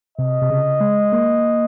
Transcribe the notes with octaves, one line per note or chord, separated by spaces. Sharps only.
C3 D#5
C3
C#3
G#3
A#3